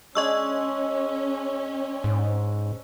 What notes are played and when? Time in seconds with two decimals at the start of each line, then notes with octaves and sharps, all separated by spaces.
0.15 G#3 C#4 D4 D#5 C#6 E6
2.04 G#2